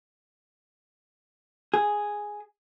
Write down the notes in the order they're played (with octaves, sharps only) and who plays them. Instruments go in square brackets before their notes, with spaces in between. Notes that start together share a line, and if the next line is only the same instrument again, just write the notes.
[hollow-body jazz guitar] G#4